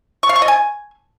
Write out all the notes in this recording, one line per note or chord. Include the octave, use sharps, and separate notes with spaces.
C#6
F5
C#6
D#5
G#5